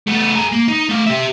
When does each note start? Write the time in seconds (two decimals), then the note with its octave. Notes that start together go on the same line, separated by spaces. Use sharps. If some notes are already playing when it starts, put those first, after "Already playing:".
0.07 A3 B3
0.35 G#4 A#4
0.52 A#3
0.68 D#4
0.89 A3 F5
1.07 G4 E5